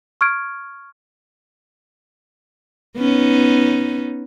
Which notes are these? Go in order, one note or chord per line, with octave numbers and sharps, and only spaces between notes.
C#6 F6 G#6 D7
B3 C#4 D#4